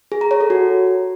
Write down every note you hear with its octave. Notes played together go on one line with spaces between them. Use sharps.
G#4
A#5
C#5
A4
F#4